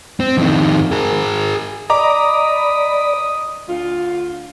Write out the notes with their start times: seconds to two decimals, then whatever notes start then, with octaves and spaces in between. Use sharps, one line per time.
0.20 C4
0.38 F2 D#3
0.92 G#4 A#4
1.90 D5 D#5 A#5 B5 D6 D#6
3.68 D2 F4